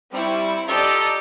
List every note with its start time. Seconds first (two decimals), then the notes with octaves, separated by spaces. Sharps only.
0.12 G3 C4 E4 C#6
0.68 F4 G4 A4 D5 D#5 A5 A#5